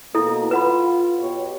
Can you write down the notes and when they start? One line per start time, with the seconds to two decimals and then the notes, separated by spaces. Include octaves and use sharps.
0.15 B2 A#3 E4 A4
0.51 F4 B4 F#5 B5
1.20 B2 G4 C#5